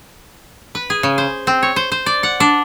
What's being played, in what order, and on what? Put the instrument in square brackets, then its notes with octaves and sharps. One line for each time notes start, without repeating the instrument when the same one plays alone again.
[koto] B4
G#4
C#3
C5
C4
C#5
C5
C5
D5
F#5
D4